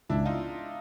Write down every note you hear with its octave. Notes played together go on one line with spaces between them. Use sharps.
C#2 D4 E4
D#4 F4